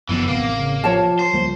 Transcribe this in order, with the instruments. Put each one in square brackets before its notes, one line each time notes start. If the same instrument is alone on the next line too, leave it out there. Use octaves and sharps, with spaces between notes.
[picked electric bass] F#1 D2 F3 [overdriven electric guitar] D3 E3 [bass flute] B3
[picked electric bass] A1 C3 [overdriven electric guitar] A#3
[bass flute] C#3
[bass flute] F3 [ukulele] C#5 A5
[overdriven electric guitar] C5
[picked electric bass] C#2 G3 A#3 [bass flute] F3